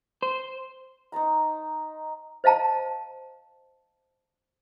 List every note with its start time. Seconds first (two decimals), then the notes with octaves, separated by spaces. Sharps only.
0.23 C5
1.12 D#4 C5 A5 A#5
2.44 C5 D#5 F5 A5 A#5